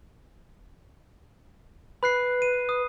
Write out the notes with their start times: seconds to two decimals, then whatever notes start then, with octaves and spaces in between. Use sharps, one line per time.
2.03 B4 B5 F#6 C7
2.42 D#7
2.69 D#6